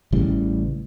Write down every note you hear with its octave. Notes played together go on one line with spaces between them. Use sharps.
A1 C#3 E3 G3